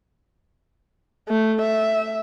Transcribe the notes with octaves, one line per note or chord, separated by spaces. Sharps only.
A3
E5